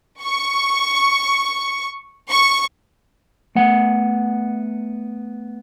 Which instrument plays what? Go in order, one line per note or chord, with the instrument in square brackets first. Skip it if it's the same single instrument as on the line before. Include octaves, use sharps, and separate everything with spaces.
[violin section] C#6
C#6
[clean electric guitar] A3 B3 F#5